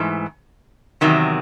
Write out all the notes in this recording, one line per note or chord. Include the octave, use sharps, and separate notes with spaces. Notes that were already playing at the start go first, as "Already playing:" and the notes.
Already playing: G#2 E3 A3
E2 C3 D#3 F#3